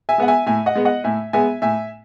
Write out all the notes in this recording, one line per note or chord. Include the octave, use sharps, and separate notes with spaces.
E5 G#5
G#3 B3 F#5
E5 G#5
A2 E5 G#5
D#5 F#5
G#3 B3
D#5 F#5
A2 E5 G#5
G#3 B3 E5 G#5
A2 E5 G#5